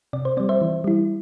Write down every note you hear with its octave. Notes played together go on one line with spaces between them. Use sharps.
C3 D5
C5
G3 C4 D5
C5 E5
E3
G3 E4